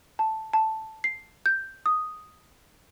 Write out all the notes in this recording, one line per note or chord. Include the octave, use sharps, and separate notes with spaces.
A5
A5
C7
G6
D#6